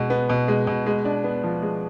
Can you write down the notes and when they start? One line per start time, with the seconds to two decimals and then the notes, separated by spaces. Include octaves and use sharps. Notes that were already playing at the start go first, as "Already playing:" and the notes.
Already playing: B2 G#3
0.10 B3
0.29 B2
0.48 G#3
0.67 B2
0.86 G#3
1.05 D4
1.24 B3
1.44 F3
1.62 G#3